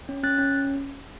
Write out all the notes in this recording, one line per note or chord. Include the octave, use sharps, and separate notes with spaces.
C#4
C#4 F#6 A6
C#4